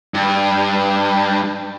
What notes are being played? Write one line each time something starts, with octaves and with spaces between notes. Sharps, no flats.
G2